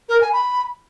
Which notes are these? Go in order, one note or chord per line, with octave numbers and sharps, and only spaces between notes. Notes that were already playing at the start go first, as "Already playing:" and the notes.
A#4
G#5
B5